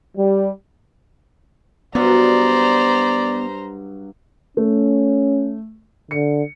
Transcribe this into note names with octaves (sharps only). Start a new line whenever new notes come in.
G3
G2 F#3 B3 C5 D5 A#5
A3 C#4
D3 C#7